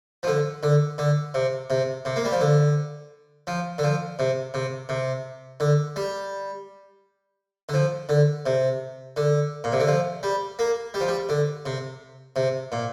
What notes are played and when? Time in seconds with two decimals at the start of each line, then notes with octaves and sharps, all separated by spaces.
0.23 F3
0.27 D3
0.63 D3
0.98 D3
1.34 C3
1.70 C3
2.05 C3
2.16 A#3
2.25 G3
2.32 F3
2.41 D3
3.47 F3
3.78 D3
3.83 F3
4.19 C3
4.54 C3
4.89 C3
5.60 D3
5.96 G3
7.69 D3
7.74 F3
8.09 D3
8.46 C3
9.17 D3
9.64 A#2
9.72 C3
9.80 D3
9.87 F3
10.23 G3
10.59 A#3
10.94 G3
11.00 F3
11.08 G3
11.29 D3
11.66 C3
12.36 C3
12.72 A#2